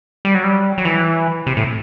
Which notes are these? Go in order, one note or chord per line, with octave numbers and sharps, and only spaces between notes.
G3
F#3
G3
F#3
E3
C3
A2